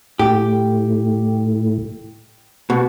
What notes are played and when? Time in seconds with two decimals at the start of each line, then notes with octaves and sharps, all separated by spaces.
0.19 A2 G4
2.70 B2 F#4